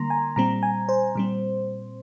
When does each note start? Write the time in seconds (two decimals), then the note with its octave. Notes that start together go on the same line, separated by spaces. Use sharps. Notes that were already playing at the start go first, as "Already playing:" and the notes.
Already playing: D3 G3 A#3 A#5 C6
0.10 G#5
0.36 A#2 G3 C4 A#5
0.63 G#5
0.89 C5
1.15 A#2 G3 C4